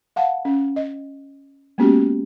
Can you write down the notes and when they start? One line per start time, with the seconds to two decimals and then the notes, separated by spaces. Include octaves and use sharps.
0.16 F5 F#5 A5
0.45 C#4
0.76 D#5
1.78 G#3 A#3 B3 C#4 F#4 G4